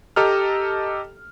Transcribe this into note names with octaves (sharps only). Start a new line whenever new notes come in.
G4 A4 D#5 A#5 F6